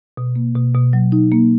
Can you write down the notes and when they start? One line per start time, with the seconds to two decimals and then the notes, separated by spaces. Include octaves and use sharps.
0.17 B2
0.36 A#3
0.56 B2
0.75 B2
0.93 F#3
1.12 D#4
1.32 A#3